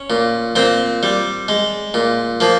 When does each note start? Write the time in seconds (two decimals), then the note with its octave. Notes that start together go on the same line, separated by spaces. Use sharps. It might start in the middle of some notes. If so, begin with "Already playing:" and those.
Already playing: C#4
0.10 A#2
0.56 A#2 C4
1.03 G3
1.48 G#3
1.94 A#2
2.40 F3 A#3